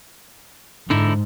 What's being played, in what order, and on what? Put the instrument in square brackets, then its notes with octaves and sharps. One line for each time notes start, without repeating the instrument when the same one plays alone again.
[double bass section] G#2 [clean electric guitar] D3 D#4 E4